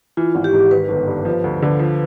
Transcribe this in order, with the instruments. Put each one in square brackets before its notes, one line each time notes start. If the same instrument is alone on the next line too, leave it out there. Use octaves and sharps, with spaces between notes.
[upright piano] E3 [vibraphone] F4
[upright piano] G#1
[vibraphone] G4
[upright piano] G#2
[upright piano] D#3 [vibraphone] B4
[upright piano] G1
G2
F3
D2
D3
F3